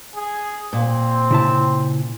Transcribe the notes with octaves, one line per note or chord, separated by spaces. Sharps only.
G#4
A#2 C4
C#3 E4 A5